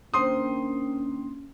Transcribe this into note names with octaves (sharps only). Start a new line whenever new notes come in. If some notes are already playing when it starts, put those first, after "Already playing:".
D#2 D#3 A#3 C#4 D4 C5 C6 D#6